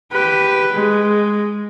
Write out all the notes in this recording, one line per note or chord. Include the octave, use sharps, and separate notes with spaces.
G4 B4
G#3